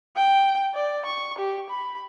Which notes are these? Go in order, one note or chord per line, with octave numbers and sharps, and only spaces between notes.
G5
D5
C#6
G4
B5